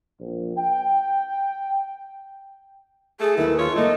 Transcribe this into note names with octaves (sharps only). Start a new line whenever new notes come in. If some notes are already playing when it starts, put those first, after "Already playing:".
A#1
G5
A3 G#4
D#2 E4 B4
F4 C#5
A3 A#3 D#4 D#5